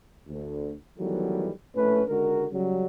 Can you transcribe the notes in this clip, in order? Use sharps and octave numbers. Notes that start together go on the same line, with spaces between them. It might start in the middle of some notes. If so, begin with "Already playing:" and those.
D2
D#3 E3 F#3 G3 A3 B3
A#1 A2 A3 C#4 B4
C#2 D3 G#3 F#4 A#4
C#3 F#3 G3